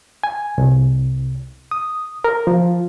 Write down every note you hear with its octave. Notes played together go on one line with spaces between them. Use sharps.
G#5
C2
D#6
A#4
F3